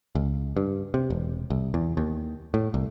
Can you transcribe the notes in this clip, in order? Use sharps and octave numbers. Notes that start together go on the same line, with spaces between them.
C#2
G2
C3
E1
C2
E2
D#2
A2
C2